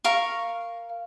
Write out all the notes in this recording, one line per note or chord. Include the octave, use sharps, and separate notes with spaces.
A#4 F5 C#6